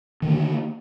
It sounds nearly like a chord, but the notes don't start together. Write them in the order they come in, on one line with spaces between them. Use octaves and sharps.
D#3 D3 A#3